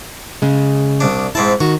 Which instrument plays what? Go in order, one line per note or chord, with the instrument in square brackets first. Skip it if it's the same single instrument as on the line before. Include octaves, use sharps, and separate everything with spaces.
[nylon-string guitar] C#3 G#3
[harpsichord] C2 D4
[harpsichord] G#2 C4 A5 [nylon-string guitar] E4
[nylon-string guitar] D#3 [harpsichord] F#4